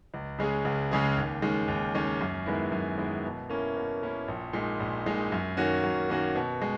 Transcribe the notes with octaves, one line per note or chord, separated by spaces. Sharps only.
C#2
C#3 G#3 C#4 G#4
C#2
C#3 G#3 C#4 G#4
D#2
D#3 G#3 C#4
D#2
D#3 G#3 C#4
F#2
D#3 G#3 B3 E4
F#2
D#3 G#3 B3 E4
B2
A#3 C#4 E4
B2
A#3 C#4 E4
A#1
A#2 G#3 D#4
A#1
A#2 G#3 D#4
F#2
D#3 A#3 C#4 F#4
F#2
D#3 A#3 C#4 F#4
B2
G#3